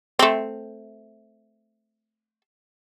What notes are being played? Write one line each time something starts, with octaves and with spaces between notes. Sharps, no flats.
A3 C4